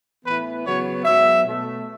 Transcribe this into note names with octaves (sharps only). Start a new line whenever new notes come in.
A2 E3 B3 B4
C#3 F#3 B3 C#5
G#2 F#3 B3 E5
B2 A3